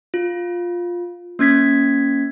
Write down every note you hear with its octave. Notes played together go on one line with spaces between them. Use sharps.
F4
A#3 C#4 G#6 B6